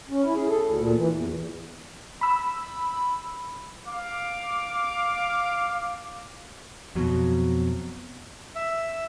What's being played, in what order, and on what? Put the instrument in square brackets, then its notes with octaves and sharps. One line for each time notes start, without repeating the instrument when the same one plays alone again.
[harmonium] C#4
E4
G#4
A4
D2
A#2
E3
E2
[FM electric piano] B5 E6
[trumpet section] F5 D6
[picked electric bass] F2 B2 F#3
[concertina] E5